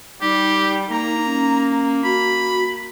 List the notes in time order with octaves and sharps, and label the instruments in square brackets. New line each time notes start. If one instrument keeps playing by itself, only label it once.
[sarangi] G3 [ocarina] D#4 [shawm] G4
[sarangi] A#3 [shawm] A#5
[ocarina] C#4
[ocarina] F#4 [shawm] B5